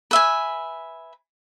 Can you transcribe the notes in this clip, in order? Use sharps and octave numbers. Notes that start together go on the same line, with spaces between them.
B4 E5 G#5